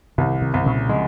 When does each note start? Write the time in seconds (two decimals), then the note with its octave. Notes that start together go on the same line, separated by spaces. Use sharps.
0.18 C2 C3 D#3
0.42 C3 D#3
0.54 C2
0.66 A#2 C#3
0.89 C#3 F3 G#3